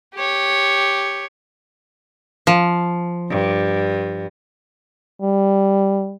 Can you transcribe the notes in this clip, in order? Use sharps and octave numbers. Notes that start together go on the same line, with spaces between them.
G4 C#5
F3
G2
G3